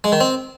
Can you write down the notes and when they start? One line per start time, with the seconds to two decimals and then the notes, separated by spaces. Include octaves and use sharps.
0.04 G#3
0.12 D#3
0.21 C4